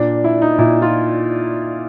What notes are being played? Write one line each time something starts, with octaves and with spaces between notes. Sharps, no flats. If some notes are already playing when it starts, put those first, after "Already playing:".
Already playing: A#2 D4
E4
D#4
A#2 E4
F4